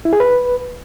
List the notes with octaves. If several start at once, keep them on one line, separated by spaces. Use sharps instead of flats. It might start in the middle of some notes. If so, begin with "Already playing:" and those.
E4
G#4
B4